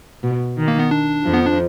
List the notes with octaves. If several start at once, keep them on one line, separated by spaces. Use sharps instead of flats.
B2
D#3
A#3
B3
D4
F2 F3
B3
D4